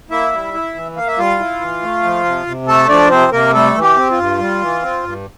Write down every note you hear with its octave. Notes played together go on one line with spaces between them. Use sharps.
A#3 E4 E5
G3
E4
E3
A#3 F5
E5
G3 F4 F5
E4
E3
A3
F3
C3
C3
A3 A4 A5
F3 D4 D5
C3 C4 C5
C3 A#3 A#4
G3 A3 A4
E3
G4
C4
F4
G2
G3
E3
C4
G2